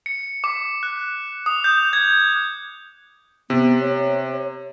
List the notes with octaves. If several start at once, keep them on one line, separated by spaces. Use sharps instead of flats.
C#7
D6
F#6
D#6
G6
G#6
C3 B3
C#5